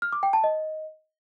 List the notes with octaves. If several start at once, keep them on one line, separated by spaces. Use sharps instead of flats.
F6
D6
G5
A5
D#5